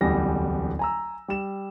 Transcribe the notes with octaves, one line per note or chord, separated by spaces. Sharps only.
D1 A1 E2 G3 A#6
G#5 A#5 E6
G3 E7